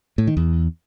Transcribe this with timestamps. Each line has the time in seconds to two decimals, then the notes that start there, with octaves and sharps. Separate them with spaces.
0.18 A2
0.27 D#3
0.37 E2